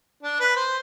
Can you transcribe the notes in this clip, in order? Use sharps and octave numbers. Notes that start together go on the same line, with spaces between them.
D4
B4
C5